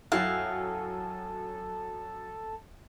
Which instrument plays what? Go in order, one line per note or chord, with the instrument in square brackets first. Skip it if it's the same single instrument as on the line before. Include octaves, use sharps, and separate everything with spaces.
[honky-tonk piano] F#2 F#3 G5 [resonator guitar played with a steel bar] E4 F#4 [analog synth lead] A4 [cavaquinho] F5